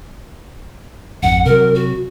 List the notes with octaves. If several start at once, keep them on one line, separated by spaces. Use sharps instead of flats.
G#1 F2 F#5
C3 F#3 A#4
F#4